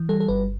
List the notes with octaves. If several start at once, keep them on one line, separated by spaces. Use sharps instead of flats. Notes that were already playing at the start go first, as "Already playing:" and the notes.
Already playing: E3
G3 A4
A4
G1 B4